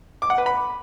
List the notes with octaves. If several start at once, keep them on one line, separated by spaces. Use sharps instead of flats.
D6
F#5
B4
B5